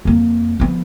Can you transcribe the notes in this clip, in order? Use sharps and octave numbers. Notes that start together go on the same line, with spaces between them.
F2 A#3
F3 B3